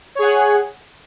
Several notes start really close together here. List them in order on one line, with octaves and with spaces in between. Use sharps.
C#5 G#4 F#5